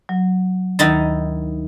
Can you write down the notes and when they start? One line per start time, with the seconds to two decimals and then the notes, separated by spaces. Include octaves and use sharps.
0.09 F#3
0.79 D2 D#3 D#4 E4 A6